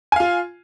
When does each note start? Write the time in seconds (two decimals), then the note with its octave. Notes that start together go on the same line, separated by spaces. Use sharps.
0.12 G#5
0.16 F5
0.20 F4